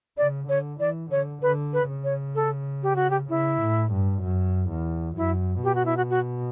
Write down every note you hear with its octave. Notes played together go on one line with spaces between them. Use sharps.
C#3 D5
D3 C#5
E3 D5
D3 C#5
D3 B4
B4
C#3
C#5
A4
G4
F#4
G4
C#3 E4
A2
G2
F#2
E2
F#2 E4
B2 G4
F#4
E4
F#4
F#4